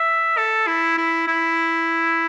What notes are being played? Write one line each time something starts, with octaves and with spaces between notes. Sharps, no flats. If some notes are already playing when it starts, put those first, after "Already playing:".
Already playing: E5
A4
E4
E4
E4